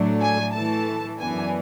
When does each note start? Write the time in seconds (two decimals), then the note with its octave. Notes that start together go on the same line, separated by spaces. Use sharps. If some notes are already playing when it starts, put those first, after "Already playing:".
Already playing: A2 F#3 A3 D4
0.21 G#5
0.53 A2 E3 A3 A5
1.19 F#2 E3 B3 D4 G#5